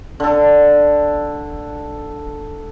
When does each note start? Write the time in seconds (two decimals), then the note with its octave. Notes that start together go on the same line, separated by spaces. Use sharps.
0.20 D3 A4